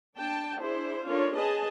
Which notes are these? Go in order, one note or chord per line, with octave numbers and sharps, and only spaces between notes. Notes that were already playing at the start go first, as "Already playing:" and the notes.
D4 G5 A5
D4 E4 G#4 C5
C#4 D4 F4 A4 A#4 C#5
G#4 B4 D#5 G#5 A5